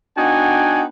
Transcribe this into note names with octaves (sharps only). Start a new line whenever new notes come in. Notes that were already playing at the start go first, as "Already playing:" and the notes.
B3 D4 D#4 F#4 G5 G#5